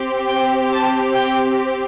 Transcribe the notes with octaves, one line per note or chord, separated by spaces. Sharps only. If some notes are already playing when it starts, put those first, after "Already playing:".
Already playing: C4 G4
G5
A5
G5